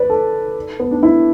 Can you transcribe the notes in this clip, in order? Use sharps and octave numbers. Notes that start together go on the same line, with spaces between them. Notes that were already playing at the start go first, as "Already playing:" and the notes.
Already playing: B4 D5
A4
B3
D4
E4